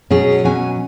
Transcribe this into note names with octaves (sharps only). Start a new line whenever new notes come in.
B2 F#3 C#4 G#4
B2 F#3 C#4 G#5